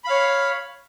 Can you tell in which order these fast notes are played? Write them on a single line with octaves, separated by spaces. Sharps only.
B5 F5 C#5